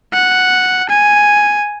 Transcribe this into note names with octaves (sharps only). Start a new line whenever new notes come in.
F#5
G#5